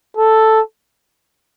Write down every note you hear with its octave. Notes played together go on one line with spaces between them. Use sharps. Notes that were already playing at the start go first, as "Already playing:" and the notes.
A4